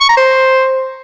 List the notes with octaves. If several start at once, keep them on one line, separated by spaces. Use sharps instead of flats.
C#6
A#5
C5